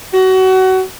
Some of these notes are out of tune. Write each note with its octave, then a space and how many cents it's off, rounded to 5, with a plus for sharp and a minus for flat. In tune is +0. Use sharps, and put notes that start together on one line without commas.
F#4 +25